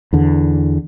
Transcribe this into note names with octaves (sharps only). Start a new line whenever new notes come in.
E2 D3